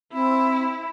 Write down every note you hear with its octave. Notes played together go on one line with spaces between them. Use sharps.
C4 E4